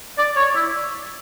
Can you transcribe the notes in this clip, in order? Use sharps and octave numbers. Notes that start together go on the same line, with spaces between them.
D5
C#5
E4